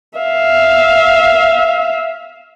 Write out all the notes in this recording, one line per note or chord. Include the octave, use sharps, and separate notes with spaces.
E5 F5